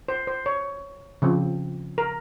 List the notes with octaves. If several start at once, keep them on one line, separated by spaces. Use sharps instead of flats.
C5
C5
C#5
C#3 F3 C4
A#4